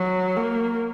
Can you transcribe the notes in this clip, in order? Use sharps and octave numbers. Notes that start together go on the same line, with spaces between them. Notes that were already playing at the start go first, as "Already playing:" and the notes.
Already playing: F#3
A#3